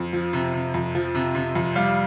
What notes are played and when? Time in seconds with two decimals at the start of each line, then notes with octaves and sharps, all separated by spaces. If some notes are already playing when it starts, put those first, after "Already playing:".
Already playing: F2
0.13 F3
0.33 C3
0.53 C3
0.74 F2
0.95 F3
1.15 C3
1.35 C3
1.55 F2
1.76 G3 F5